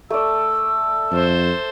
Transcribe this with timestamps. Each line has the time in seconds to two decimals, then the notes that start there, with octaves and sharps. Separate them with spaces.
0.10 A3 D5 E6
1.12 F2 A4 C5